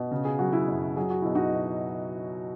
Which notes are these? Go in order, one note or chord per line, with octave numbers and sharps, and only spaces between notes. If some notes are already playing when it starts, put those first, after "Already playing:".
Already playing: B2
C#3
G#4
F#3 F#4
E4 G#4
F#2
F#3 G#4
F#4
B2 E4
D#4 F#4
B2